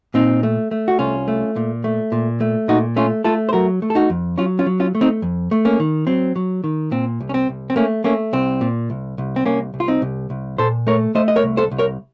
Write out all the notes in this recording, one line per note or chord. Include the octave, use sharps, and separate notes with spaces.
A#2 C4 D#4
A3
A3
F#4
C2 C#4 F4
A3
A#2
A3
A#2
A3
A#2 D#4 F#4
A3 C#4 F4
A3 F4 A4
C5
F#3 F#4 A#4
A3
A4
D#4 F#4
F2
F#3 C#4 F4
C#4 F4
F#3
C#4 F4
A3
C4 D#4
F2
A3
A#3 C#4
D#3
F#3 C4
F#3
D#3
A#2 C4
C2
C#4
C4
C2
C4
A3 A#3 C#4
A3 A#3 C#4
C2 C4
A#2
C2
C2
C4
C2 A#3 C#4
C2
F4
C4 D#4
C2
C2
A#2 A4 C5
A3 A#4 C#5
A3 C5 D#5
D#5
A#4 C#5
C2
A4 C5
C2
A#4 C#5